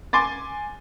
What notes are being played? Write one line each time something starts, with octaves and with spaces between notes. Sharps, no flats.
G#5 C6 D6 A6